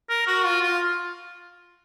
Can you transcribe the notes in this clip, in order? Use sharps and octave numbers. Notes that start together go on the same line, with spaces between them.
A#4
F#4
F4
F4